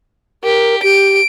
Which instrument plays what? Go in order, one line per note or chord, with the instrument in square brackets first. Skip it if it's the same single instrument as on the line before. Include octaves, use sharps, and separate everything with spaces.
[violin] G4 [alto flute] A#4
[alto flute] G4 [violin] D7